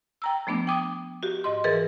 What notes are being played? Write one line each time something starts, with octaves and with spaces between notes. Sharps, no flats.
G5 A#5 E6
F3 A3 B3 D4 D6
G5 D6 D#6
F#4 G4
G#2 D#5 C6
G#2 E3 G#4 A#4 B4 A6